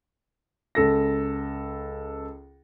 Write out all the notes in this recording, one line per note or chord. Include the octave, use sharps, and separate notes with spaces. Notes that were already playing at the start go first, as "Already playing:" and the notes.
C#2 A4 A#6